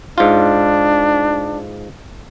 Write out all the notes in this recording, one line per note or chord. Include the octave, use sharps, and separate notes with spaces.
G#2 D4 F4